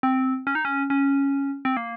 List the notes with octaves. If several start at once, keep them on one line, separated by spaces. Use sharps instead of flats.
C4
C#4
D#4
C#4
C#4
C4
A#3